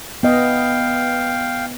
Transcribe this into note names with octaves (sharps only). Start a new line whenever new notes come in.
B3 D#5 F5 G5